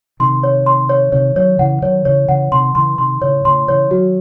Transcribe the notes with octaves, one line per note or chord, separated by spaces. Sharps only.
C3 D#3 C6
C#5
C6
C#5
C3 D#3 C#5
D#3 F#3 C#5
C#3 E3 F#5
D#3 F#3 C#5
C#3 E3 C#5
C#3 E3 F#5
C3 D#3 C6
C#3 E3 C6
C3 D#3 C6
A2 C#3 C#5
A2 C#3 C6
C#3 E3 C#5
D#3 F#3 F#4